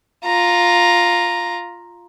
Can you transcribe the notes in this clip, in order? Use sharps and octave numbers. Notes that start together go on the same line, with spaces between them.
F4 A#5